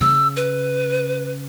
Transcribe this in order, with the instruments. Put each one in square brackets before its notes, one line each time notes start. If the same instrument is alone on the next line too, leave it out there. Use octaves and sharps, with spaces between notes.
[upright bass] C#3 [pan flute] E6
[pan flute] B4